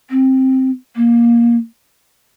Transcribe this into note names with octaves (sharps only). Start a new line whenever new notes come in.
C4
A#3